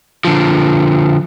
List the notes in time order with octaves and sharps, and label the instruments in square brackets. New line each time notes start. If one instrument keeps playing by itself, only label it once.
[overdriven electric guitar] D3 F3